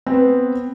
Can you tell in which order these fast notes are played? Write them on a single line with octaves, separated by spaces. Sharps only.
C4 B4 B3